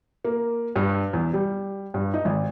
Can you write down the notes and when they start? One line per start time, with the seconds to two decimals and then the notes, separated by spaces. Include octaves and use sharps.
0.25 A#3
0.76 G2
1.13 E2
1.33 G3
1.94 G2
2.14 D#4
2.25 G#1